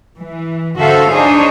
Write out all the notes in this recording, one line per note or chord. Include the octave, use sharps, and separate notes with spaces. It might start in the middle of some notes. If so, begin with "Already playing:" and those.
E3
D3 F#4 A4 C5 E5 F5
D4 D#4 G#4 C5 C#5